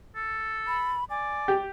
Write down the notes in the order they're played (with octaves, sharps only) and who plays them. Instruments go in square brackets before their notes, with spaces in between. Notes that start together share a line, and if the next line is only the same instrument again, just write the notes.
[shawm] A4
[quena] B5
[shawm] D5 [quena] G#5
[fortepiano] G4